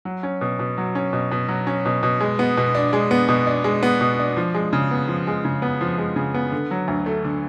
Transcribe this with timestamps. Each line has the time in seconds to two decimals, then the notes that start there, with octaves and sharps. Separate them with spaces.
0.05 F#3
0.23 C#4
0.41 B2
0.59 B2
0.78 F#3
0.95 C#4
1.13 B2
1.31 B2
1.48 F#3
1.67 C#4
1.85 B2
2.03 B2
2.20 G#3
2.39 B3
2.57 B2
2.75 D4
2.93 G#3
3.11 B3
3.29 B2
3.47 D4
3.64 G#3
3.83 B3
4.01 B2
4.19 D4
4.37 F3
4.54 G#3
4.73 C#3
4.91 B3
5.08 F3
5.27 G#3
5.45 C#3
5.62 B3
5.81 F3
5.98 G#3
6.16 C#3
6.34 B3
6.52 D3
6.71 F#3
6.88 D2
7.06 A3
7.25 D3